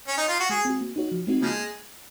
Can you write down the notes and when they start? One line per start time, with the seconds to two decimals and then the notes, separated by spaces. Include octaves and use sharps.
0.08 C#4
0.18 D#4
0.28 F4
0.40 F#4
0.49 G#3 G#4
0.65 C4 F#4
0.81 A#3
0.96 D#4 F#4 C#5
1.12 F3
1.27 G#3 C4 D#4 F#4
1.42 C#3 F3 G#3 A#3